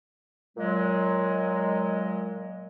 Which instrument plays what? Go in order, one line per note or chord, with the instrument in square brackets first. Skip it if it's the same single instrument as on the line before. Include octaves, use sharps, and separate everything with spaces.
[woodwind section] A#2 F#3 G#3